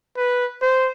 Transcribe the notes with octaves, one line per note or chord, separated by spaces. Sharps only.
B4
C5